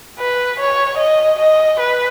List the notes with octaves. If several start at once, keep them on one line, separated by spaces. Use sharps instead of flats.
B4
C#5
D#5
D#5
B4